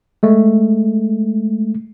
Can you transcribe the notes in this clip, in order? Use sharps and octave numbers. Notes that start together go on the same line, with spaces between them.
G#3 A3